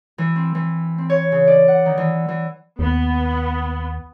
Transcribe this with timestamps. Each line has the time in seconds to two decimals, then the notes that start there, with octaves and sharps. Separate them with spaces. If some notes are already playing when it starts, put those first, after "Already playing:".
0.18 E3
0.36 C4
0.55 E3
0.98 C4
1.10 C#5
1.32 C#3
1.47 D5
1.68 F#5
1.86 D#3
1.98 E3
2.28 E3
2.79 D#2 B3